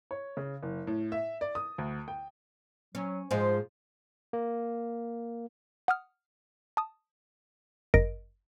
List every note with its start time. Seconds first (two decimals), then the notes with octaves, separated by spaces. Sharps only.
0.11 C#5
0.37 C#3
0.63 F#1
0.87 A2
1.12 E5
1.41 D5
1.55 D#6
1.78 D2
2.08 G5
2.95 F#3 C#4
3.31 G#2 F3 G#3 C5
4.33 A#3
5.88 F#5 D#6 F6
6.77 A5 D#6
7.94 G1 F#2 A#4 D#5 A#6 D7